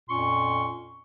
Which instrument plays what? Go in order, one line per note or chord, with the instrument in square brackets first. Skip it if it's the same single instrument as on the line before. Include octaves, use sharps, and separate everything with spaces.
[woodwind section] F2 A#2 C#4 C6 C#6